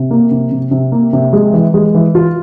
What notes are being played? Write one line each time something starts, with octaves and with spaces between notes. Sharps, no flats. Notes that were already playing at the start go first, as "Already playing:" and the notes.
Already playing: C3
A#3
C3
C3
C3
A#3
C3
G#3
E3
G#3
E3
F4